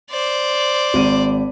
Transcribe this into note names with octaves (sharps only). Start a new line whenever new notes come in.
C5 D5
G#1 D#7